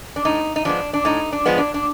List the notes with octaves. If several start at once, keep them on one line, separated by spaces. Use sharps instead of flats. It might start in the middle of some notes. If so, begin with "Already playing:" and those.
D4
A2 D#4
D#4
F3 G#3 B3 D4
D4
A2 D#4
D4
F3 G#3 B3
D4
D4